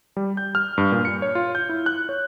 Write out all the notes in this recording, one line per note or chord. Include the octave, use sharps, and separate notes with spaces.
G3
G6
F6
G2
A#2
C#7
C#5
F4
G6
E4
F#6
C#5